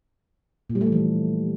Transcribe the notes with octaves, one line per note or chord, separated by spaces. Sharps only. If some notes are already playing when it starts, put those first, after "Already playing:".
A#2
G3
A3
E3
F3